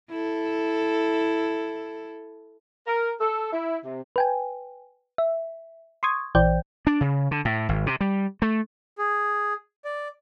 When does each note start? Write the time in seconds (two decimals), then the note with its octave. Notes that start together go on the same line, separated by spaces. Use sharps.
0.10 E4 A4
2.87 A#4
3.20 A4
3.52 E4
3.84 C3
4.16 B4 G5 G#5
5.18 E5
6.03 C6 C#6 D#6 G#6
6.35 A#1 E3 C5 D5 G5 G6
6.87 D4
7.01 C#3
7.31 D3
7.45 A2
7.69 G#1
7.87 C3
8.01 G3
8.42 A3
8.98 G#4
9.85 D5